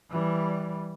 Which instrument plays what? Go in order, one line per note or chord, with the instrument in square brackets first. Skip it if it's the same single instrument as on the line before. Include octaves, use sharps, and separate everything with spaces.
[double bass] E3 G3